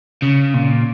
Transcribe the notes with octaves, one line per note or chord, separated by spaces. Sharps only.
C#3
A#2